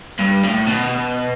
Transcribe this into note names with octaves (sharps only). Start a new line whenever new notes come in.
G2
A2
B2